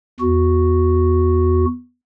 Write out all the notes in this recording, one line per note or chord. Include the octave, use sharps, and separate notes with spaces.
E2 F#4